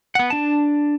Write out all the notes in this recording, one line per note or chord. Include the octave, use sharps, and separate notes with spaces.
B3 F#5
D4 A5